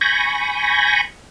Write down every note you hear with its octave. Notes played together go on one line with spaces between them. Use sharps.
G#5 B5 C#6 G6 A#6